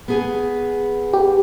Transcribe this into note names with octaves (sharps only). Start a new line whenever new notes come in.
B3 G#4 G#5
G4